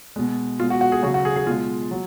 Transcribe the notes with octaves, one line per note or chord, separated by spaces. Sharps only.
B2 G#3
B2 G#3 F4
F#4
F#4
G#4
C#3 F#3 F#4
F#4
G#4
G#4
B2 G#3 F4
F#3